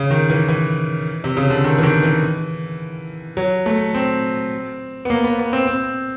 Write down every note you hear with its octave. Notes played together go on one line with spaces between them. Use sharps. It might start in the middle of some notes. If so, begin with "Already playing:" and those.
Already playing: C#3
D#3
E3
E3
C3
C#3
D3
D#3
E3
D#3
E3
F#3
A3
C4
B3
A#3
B3
B3
C4
C4